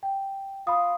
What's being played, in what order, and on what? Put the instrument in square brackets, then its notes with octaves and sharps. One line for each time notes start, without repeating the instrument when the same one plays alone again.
[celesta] G5
[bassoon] F4 [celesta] B5 D#6